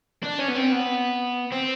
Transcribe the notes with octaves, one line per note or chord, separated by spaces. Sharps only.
D4
C#4
B3
C4
B3
C4